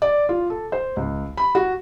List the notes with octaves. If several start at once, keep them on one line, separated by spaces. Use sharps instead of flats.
D5
F4
A4
C5
C#2
B5
F#4